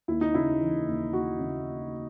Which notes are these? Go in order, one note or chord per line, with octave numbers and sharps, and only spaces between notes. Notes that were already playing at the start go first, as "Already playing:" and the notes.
D#2 E4
D#4
C#3 E4
E3
D#2
D#2 F#4
C#3